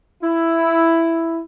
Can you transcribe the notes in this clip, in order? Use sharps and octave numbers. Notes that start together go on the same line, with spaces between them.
E4